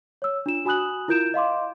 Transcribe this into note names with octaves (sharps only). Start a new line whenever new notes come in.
C#5 E6
D4 F4 E7
F#4 G#5 B5 D#6 F#6 F#7
E4 F4 A#4 G6 D7 E7
D#5 F5 C6 D6